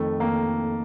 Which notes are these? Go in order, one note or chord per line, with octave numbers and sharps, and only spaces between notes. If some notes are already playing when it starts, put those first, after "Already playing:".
Already playing: F2 D#3 A3
F2 D#3 A#3